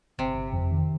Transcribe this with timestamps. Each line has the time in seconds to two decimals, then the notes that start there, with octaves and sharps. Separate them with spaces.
0.19 G1 C3
0.36 G1
0.53 F2
0.71 D#3